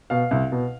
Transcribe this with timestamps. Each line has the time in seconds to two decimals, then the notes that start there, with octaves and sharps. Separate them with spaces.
0.10 B2 F5
0.31 C2
0.52 B2